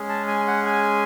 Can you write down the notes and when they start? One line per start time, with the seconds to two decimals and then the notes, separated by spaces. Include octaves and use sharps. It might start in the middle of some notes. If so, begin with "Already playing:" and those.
Already playing: G#3 C#4 G#4
0.09 A5
0.28 G#5
0.47 F#5
0.66 G#5